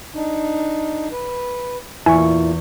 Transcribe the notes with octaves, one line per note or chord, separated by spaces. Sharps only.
D4 D#4
B4
E2 A#2 E4 G#5 C#6 B6